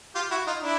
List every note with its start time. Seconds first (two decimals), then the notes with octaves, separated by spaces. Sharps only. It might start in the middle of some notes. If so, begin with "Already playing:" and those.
0.15 F4 G4
0.31 E4 F#4
0.47 D#4 F4
0.62 D4 E4